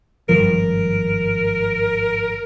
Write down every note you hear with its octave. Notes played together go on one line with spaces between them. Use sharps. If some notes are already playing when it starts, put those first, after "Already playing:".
G#1 G2 F3 A#4